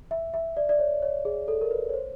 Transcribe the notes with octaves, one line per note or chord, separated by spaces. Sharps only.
E5
E5
D5
D5
C#5
C#5
G#4
A4
A#4
B4
C#5
C5